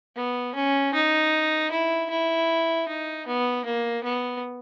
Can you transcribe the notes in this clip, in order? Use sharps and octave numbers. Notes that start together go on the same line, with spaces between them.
B3
C#4
D#4
E4
E4
D#4
B3
A#3
B3